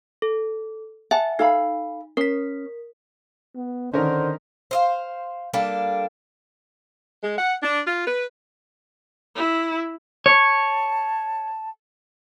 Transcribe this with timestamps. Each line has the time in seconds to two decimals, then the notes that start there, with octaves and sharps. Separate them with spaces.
0.22 A4
1.11 E5 F#5 G#5 A5
1.39 D#4 A4 F5 B5
2.17 C#4 A#4 B6
3.56 B3
3.94 D3 D#3 C#4 D#4 A#4 C5
4.71 C5 D#5 F5
5.54 G3 A#3 D4 A4
7.22 G#3
7.37 F#5
7.62 D4
7.86 F4
8.06 B4
9.36 E4
10.26 C#5 A5